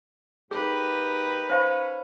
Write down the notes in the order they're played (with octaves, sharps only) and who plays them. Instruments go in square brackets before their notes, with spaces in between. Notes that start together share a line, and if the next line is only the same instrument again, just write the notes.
[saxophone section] G#2 A#3 G4 [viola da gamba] D#4 B4 [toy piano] G#4
[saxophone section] C#4 [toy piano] C5 F5 B5